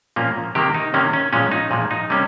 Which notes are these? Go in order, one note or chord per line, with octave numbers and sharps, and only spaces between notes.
A#2 F3 A#3 C#4
C3 D#3 A#3 G4
D#4
C3 D#3 A#3 C#4
C#4
A#2 F3 G#3 C#4
D#4
A#2 F3 G#3
D#4
C3 G3 A#3 C#4